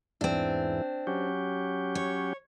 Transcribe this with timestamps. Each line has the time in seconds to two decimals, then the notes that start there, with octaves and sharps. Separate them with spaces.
0.21 E2 G#2 E3 C4 D4
1.07 F#3 C#4 G4
1.95 C#5